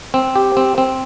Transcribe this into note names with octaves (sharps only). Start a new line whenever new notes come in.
C4
G4
C4
C4